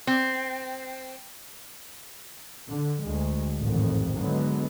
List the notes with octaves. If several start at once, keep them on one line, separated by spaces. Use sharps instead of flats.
C4
D3
D2 G#3
A1 F2 G#2 D#3
D3 F#3 G#3 B3